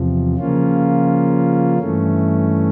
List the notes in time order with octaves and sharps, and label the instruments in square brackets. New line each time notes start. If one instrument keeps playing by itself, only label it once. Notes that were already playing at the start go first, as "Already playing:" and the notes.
Already playing: [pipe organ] E2 C3 F3
C#3 F3 A#3 C#4 F4
G2 E3 A3 C#4